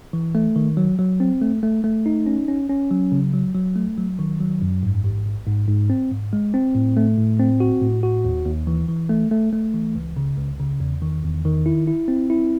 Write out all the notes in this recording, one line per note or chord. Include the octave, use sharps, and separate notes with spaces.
E3
A3
D#3
F#3
F#3
C4
A3
A3
A3
D#4
C#4
C#4
C#4
F#3
C#3
F#3
F#3
A3
F#3
D#3
F#3
F#2
G#2
A1
A1
G#2
G#2
C4
G#2
G#3
C4
A2
A3
A2
C4
F#4
A2
F#4
D#2
D#2
E3
E3
A3
A3
A3
E3
C#2
C#3
C#2
C#3
E2
D#3
E2
D#3
E4
E4
C4
E4